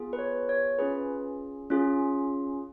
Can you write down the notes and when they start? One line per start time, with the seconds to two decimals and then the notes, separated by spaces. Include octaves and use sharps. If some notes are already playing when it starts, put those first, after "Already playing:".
Already playing: B3 F4 G#4
0.13 B4
0.19 C#5
0.49 C#5
0.79 C#4 F4 G#4 B4
1.70 C#4 F4 G#4